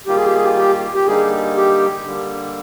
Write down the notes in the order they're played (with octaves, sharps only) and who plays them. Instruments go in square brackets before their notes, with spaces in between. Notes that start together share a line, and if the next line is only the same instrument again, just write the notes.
[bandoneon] D#3 G3 A#3 F4 [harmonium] G4
[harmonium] G#4
G4
G#4
G4
G4
G4
[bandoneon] D3 G3 A#3 D#4 [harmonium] G#4
[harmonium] G4
[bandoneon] D3 G3 A#3